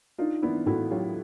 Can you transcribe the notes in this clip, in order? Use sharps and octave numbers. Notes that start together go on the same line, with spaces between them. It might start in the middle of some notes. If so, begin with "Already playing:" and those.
D4 D#4 F4
B3 D4 E4
A2 E4 F#4
F#3 F4 G4